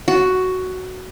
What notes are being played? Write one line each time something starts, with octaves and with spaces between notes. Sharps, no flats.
F#4